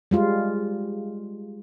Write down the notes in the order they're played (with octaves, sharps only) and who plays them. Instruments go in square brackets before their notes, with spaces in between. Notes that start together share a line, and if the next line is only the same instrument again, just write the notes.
[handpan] G3 G#3 F4